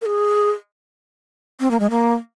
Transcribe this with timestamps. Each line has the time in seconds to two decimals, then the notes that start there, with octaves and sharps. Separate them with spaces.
0.02 A#4
0.06 G#4
1.60 C4
1.71 A#3
1.80 G#3
1.90 A#3